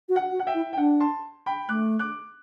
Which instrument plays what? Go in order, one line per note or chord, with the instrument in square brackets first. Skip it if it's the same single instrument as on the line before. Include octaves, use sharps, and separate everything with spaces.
[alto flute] F#4
[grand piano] F#5
[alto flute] F#4
[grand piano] F#5
E5 G5
[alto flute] E4
[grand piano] G5
[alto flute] D4 [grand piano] F#5
[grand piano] A5 C6
G5 B5
[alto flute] A3 [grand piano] D6 F#6
[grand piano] D6 F#6